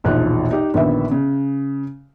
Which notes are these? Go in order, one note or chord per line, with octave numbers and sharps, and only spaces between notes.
E1 A#1 D#4 F4 F#6
D#4 G4 D#5
A#1 D3 D#3 B3 E5
C#3